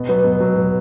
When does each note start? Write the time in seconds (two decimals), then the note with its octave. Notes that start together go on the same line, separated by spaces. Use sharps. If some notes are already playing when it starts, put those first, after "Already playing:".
Already playing: B2
0.09 F#3 B3
0.25 B2
0.40 F#3 B3
0.56 B2